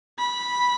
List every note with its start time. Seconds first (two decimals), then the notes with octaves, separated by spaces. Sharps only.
0.19 B5